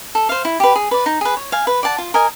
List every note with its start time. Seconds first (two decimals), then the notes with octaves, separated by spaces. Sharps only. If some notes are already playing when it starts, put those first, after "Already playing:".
0.15 A4
0.29 C5 F5
0.45 E4
0.60 G4 B4
0.75 G#4
0.91 B4 D5
1.06 D#4
1.21 G#4 B4
1.37 C#5
1.52 F5 G#5
1.67 B4
1.83 D5 F#5 A5
1.98 F4
2.14 A#4 D#5 G#5